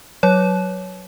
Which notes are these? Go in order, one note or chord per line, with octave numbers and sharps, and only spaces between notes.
F#3 C#5